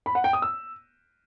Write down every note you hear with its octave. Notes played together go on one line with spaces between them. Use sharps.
B5
F#5
G5
D#6
E6